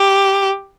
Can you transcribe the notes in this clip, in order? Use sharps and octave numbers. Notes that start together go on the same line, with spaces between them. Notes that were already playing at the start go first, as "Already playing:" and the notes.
Already playing: G4